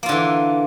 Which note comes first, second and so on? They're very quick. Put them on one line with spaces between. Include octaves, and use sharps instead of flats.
A#3 F4 D3 E3